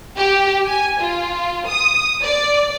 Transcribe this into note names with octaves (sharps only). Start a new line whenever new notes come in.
G4
G#5
F4
D#6
D5